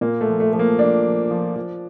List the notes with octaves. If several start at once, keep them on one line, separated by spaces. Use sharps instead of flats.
A#2 A#3
A3
F3
A3
F3 A3
A#3
F3 D4
F3
F3
F3